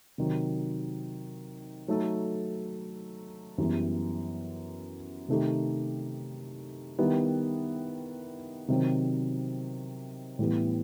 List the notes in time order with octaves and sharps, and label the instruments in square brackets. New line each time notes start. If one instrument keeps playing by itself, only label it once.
[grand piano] C3 D#3 F#3
F#3 A3 D#4 A4
F#2 E3 G3 B3
C3 D#3 A3 D#4 G4
D#3 G3 B3 E4
C3 D#3 F#3 C4
A2 E3 G3 B3